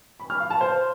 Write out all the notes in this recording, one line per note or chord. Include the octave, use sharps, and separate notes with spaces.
B5
F6
F5
A5
C5